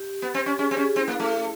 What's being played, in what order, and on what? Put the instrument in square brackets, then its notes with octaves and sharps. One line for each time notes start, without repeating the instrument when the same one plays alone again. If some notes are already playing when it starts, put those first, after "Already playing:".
Already playing: [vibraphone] G4
[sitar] B3
C4
C#4
[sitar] C#4 [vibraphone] G#4
[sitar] C4 [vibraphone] G4
[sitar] C#4
[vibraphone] G#4
[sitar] C4 [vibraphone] E4
[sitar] A#3
A3